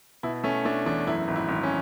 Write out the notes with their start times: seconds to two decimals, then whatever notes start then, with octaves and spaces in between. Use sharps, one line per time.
0.23 B2 E4
0.44 A3 C#4
0.65 A3 D4
0.86 E2 D4
1.07 F#2 E4
1.28 G#1
1.36 E4
1.48 G#1
1.63 C#4